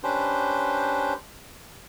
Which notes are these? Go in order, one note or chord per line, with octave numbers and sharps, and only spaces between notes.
C#4 D4 G4 B4 C5